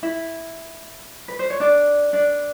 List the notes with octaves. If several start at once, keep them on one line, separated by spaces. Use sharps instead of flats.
E4 E5
B4
C5
C#5
D4 D5
D4 D5